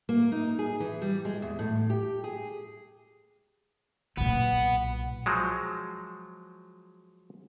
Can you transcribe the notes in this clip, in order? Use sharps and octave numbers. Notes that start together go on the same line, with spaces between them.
A#3
D#4
G#4
E3
G3
G#3
E2
A2
G4
G#4
B1 A#2 B3
F3 F#3 G#3